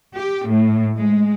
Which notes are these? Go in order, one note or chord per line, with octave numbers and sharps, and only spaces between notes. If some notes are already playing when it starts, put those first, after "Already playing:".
G4
A2
G#3